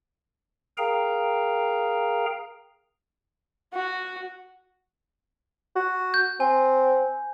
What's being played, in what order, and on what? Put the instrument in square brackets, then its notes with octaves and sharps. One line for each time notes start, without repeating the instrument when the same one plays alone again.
[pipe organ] G#4 A#4 F5 G5 A#5
[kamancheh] F#4
[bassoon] F#4
[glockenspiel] G6
[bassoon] C4 [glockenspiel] G#5